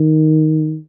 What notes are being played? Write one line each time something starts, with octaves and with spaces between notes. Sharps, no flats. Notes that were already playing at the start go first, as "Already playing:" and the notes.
Already playing: D#3